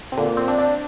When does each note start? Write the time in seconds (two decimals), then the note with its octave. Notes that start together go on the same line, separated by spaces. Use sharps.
0.12 C3
0.17 A#2 D3
0.37 C4
0.48 D4
0.58 D4